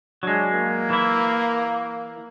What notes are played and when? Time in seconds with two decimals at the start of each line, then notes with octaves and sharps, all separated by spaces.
0.23 F#3 G#3 D4
0.54 A#3
0.90 E3 E4